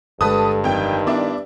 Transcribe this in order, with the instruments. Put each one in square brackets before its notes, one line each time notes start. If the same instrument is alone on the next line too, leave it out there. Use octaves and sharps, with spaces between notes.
[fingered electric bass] G1 G#3 [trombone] G2 [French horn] A4 [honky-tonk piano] B4 A5 D#6
[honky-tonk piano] F2 G5 [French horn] D#3
[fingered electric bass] B3 [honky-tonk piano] D4 E4 D5